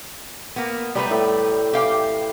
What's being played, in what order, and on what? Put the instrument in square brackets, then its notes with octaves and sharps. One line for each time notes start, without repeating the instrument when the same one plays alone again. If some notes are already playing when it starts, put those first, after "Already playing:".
[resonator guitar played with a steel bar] A#3 B3
[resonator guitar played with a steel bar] G3 A3 B4 [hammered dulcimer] D5 A#5 B5
[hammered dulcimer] A2 G5
[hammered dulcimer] E3 [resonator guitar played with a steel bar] G4 F5 G5